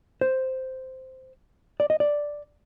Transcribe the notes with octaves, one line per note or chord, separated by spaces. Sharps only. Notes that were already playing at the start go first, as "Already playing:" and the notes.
C5
D5
D#5
D5